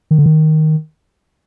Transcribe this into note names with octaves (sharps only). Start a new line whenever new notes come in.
D#3
D3
D#3